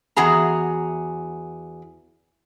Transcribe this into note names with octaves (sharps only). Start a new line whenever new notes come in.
E2 F#4 G#4 A#5